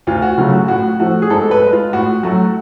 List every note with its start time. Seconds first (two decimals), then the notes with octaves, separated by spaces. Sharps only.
0.07 D2 F4
0.22 F#4
0.38 C#3 F#3 A3 F4
0.53 F#4
0.68 A2 F#4
1.00 F3 A3 F#4
1.22 G#4
1.30 G#2 A4
1.51 B4
1.62 G#3
1.73 F4
1.93 A2 F#4
2.23 F#3 A3 F#4